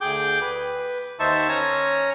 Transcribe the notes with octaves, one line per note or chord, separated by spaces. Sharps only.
D2 G#4 G5 D6 G6
B4
D#2 D#4 C5 E5 A5 C#6
C#4 C#5 G#5 A#5